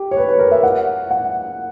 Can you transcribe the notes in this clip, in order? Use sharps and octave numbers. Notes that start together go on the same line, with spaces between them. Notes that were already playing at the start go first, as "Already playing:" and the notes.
Already playing: G4
C#5
B4
B4
A#4
E5
F#5
F#5